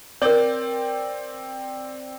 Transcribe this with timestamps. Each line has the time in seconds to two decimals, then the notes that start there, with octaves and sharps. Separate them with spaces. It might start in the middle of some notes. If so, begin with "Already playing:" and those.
0.22 C4 A#4 C#5 D5 G6